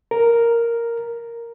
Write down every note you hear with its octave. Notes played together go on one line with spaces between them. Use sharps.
A#4